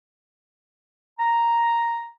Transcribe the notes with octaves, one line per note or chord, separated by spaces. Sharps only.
A#5